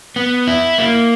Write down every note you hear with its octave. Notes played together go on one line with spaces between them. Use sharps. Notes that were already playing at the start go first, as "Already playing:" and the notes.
B3
E4
A#3